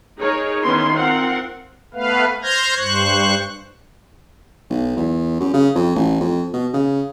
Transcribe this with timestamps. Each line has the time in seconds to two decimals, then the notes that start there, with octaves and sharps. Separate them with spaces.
0.19 D#4 G#4 A#4 C#5
0.63 D#3 B3 C#4 E4 C6
0.94 C4 F4 A#4 F#5 C6
1.94 A3 B3 B4 F5
2.42 C5 F6 G6 G#6 A#6
2.77 G2 C5 C#6 F#6
4.70 B1
4.97 E2
5.40 F#2
5.54 C#3
5.76 F2
5.96 A1
6.20 F2
6.53 B2
6.73 C#3